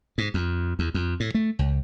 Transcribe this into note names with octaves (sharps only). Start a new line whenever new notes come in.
G#2
F2
E2
F2
A2
A3
C#2